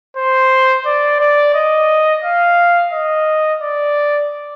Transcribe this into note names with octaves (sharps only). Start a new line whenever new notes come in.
C5
D5
D5
D#5
F5
D#5
D5